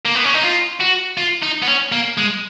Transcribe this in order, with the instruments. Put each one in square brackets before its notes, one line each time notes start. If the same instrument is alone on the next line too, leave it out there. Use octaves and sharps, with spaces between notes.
[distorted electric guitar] A#3
B3
C#4
D#4
F4
F#4
F4
D#4
B3
C#4
A#3
G#3